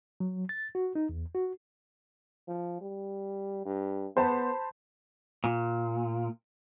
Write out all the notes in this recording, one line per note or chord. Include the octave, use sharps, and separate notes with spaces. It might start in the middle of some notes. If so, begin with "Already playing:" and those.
F#3
A6
F#4
D#4
E2
F#4
F3
G3
G2
B3 C5 A5 B5
A#2